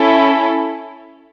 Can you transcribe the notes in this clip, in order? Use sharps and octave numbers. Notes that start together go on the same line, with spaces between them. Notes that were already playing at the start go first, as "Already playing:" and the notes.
Already playing: C#4 E4 A4